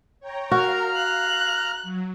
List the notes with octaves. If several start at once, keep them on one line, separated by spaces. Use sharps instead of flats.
C#5 G5 A#5
F#4 A#4 F5 A#5 F6
F#6
F#3